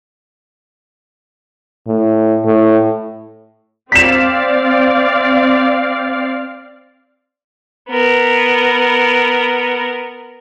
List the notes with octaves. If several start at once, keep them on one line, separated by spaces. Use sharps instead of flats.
A2
A2
C4 D5 F5 B6 E7
B3 A#4